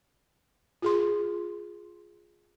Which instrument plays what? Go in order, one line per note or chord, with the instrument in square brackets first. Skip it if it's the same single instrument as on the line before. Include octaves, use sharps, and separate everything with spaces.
[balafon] F4 G#4 C6